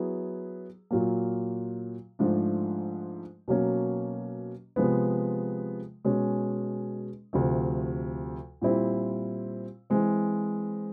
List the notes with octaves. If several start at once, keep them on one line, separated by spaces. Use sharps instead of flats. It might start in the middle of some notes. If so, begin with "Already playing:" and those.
Already playing: F#3 B3 E4 G#4
A#2 F#3 A#3
G#2 F3 A3 D4
B2 F#3 A#3 C#4
C3 F3 G#3 B3
B2 G#3 C#4
D2 C3 F3 A3
A#2 G3 C4 E4
E3 G#3 C4